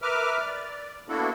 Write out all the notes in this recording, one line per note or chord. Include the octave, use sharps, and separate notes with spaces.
A#4 B4 E5 D6 F6
D5
A#3 B3 D4 E4 F#4 A4